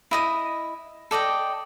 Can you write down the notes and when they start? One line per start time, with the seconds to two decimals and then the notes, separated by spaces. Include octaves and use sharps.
0.11 E4 D#5 D#6
1.11 A4 D5 D#5 G5